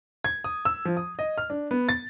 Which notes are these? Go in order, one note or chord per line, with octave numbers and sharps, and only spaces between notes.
G#6
D#6
E6
F3
D#6
D#5
F6
D4
B3
A6